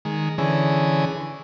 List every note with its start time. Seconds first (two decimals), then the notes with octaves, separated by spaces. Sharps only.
0.05 D#3 G#3
0.38 D3 E3 C#4 G#4